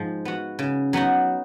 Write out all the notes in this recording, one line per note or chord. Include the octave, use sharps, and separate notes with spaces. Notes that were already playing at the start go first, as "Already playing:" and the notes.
Already playing: G#2 F3 G#3
B3 F#4
C#3
F#3 B3 D#4 F#4